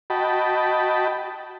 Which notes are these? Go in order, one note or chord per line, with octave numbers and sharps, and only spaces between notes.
F#4 D#5 G5 A5 B5